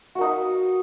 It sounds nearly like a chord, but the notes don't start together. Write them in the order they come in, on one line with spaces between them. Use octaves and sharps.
F#4 A#3 D#4 B4